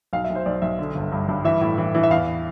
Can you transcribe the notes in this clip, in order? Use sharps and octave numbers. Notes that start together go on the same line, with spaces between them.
B1 F5
E5
B1
C5
B1 D5
B1 E5
D3
G1
G2
G2
E3 E5
A2
E3
E3
E5
E2 F5